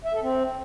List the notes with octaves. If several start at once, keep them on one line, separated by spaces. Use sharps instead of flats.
E5
A4
C4